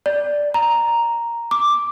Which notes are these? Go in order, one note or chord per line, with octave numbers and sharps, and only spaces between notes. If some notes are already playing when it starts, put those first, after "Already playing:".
D5
A#5
D6